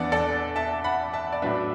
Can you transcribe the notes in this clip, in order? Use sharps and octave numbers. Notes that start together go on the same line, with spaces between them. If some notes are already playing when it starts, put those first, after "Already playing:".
Already playing: E2 E3 B3 D4 D5 F#5 A5
A4 D5
E5 A5
F#5 B5
E5 A5
D5
A2 F#3 D4 B4 E5